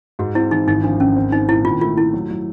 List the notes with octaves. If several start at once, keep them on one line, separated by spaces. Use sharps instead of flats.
G#2 F#4
C4 E4
E3 D#4
G#1 D#4
F3 D4
G#1 C#4
C4
C4 D#4
A#2 E4
D#3 F4
A3 F4
A3 E4
F#3
F#3